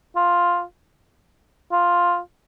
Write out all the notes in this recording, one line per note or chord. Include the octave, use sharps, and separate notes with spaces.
F4
F4